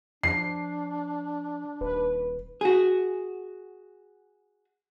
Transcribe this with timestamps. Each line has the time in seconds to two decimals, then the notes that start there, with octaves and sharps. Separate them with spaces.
0.23 F3 D4 C7
1.81 D#1 B4
2.61 F#4 G#4